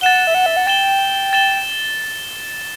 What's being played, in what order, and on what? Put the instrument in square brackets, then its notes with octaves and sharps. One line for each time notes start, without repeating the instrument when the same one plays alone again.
[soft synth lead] F#5 [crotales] A6 E7 G7
[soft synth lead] E5
F#5
E5
F#5
[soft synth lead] G5 [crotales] A6 E7 G7
[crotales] A6 E7 G7